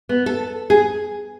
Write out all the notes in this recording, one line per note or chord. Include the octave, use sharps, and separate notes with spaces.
B3
A4
G#4